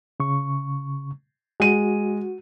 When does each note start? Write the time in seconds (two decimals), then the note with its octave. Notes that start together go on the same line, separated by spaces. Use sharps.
0.20 C#3 C#6
1.60 G#3 F#4 D#7